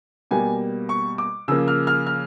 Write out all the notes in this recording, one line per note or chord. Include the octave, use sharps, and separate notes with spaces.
B2 G3 A#3 G#5
C#6
D6
C#3 F3 A#3 E6
F6
F6
F6